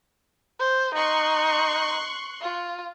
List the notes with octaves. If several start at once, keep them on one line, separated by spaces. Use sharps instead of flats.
C5
D#4 C6 C#6 F#6
F4